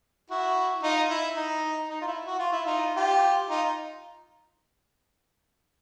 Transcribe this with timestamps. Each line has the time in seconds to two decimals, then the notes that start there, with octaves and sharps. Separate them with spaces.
0.30 E4 F#4
0.83 D#4 F4
1.10 E4
1.37 D#4
1.89 D#4
2.01 F4
2.07 E4
2.25 F#4
2.39 F4
2.52 E4
2.66 D#4 F4
2.96 F4 G4
3.50 D#4 F4